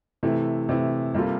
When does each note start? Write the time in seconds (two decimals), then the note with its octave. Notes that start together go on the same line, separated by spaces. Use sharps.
0.23 C3 E3 A3 E4
0.69 C3 E3 A3 E4
1.14 C3 G3 A#3 F4 A4